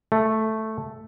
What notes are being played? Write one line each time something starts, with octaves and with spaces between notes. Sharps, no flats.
A3